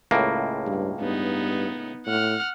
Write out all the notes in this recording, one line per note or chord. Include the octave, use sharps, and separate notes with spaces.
C#2 A2 A#3
G2
G2 B3 D#4
A2 F#5 F6